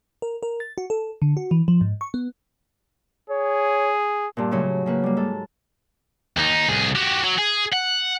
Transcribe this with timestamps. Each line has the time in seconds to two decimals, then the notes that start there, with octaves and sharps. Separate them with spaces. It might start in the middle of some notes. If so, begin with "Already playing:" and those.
0.22 A#4
0.43 A#4
0.60 A6
0.78 F#4
0.90 A4
1.22 D3
1.37 F#4
1.51 E3
1.68 F3
1.81 G#2
2.01 C#6
2.14 B3
3.30 G#4 C#5
4.37 G2 A#2
4.51 A2 C#3 F#3
4.86 C#3 A#3 B4
5.04 G3 A#3
5.17 G#2 A4
6.37 D#2 D#4
6.69 C2 G#4
6.96 F#4 G4
7.24 F#3
7.39 G#4
7.73 F#5